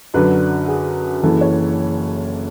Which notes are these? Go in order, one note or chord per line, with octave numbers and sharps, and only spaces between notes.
F#2 D3 F#3 B4
G#4
F#1 F#2 E3 A4
C#5